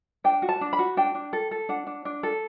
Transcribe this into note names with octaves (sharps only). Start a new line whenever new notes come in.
D4 G5
F#4
A5
D4
B5
F#4
D4 G5
D4
A4
A4
D4 F#5
D4
D4
A4